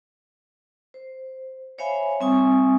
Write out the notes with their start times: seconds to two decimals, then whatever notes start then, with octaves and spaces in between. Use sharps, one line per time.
0.94 C5
1.78 C5 C#5 E5 F5 G#5 B5
2.20 G3 C4 E5 G#5 C#6 D#6